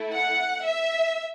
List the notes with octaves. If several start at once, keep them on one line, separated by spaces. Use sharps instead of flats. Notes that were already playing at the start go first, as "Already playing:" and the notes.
Already playing: A3 E4 A4
F#5
E5